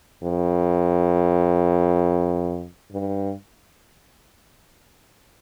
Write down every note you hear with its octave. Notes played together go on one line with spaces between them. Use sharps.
F2
G2